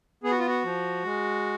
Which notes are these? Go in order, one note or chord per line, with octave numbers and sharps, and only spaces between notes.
B3 G#4
F#4
F4
F#4
F3
G#3